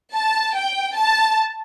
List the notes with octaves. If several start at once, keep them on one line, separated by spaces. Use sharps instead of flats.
A5
G5
A5